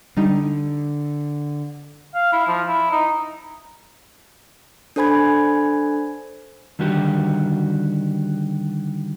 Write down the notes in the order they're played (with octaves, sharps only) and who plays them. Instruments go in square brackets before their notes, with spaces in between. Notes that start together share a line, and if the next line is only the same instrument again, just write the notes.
[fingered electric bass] D3 [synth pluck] G3 D#4
[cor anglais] F5
E4
F3
E4
D#4
[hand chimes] D4 A4 C5 G#5 B5 G#6
[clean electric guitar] D3 D#3 G3 F#4 G4